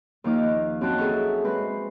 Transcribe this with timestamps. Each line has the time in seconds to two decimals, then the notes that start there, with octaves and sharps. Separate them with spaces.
0.24 D#2 F3 A#3 D#4 D6 F6
0.81 F#2 C4 F#4 G5 A5 F#6
0.98 G#4 A4 E5 G#5 A#5 C#6
1.45 G#3 C4 B4 C5